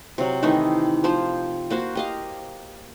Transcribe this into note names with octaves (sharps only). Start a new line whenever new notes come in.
C3 F#3
D#3 E3 A3 D#4
F3 F4 C5
A#3 F#4 C5
G4 D#5 F5